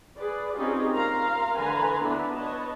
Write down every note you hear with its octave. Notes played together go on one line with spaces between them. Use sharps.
G#4 B4 D5
C4 C#4 D#4 F4 G4 G#4
A#4 F5 A#5 C6
D3 E3 B4 G#5 A#5 C6
B3 D4 E4 B4 D5
B4 C#5 D#5 A5